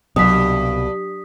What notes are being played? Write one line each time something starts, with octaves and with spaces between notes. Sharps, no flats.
C2 G2 B2 F#3 D#6 B6